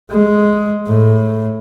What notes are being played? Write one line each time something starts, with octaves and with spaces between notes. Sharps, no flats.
G#3
A2